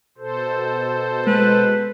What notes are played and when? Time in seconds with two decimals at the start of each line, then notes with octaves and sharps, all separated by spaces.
0.18 B2 A4 C5
1.26 G#3 B4